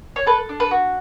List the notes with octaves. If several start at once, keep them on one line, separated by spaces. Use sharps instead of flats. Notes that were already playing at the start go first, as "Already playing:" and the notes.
C#5
A4 B4
D4
B4
F#4